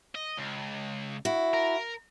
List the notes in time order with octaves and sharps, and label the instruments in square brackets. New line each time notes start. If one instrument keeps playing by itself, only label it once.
[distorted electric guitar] D#5
C#2
[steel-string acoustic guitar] E4 F#4
[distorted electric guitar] A#4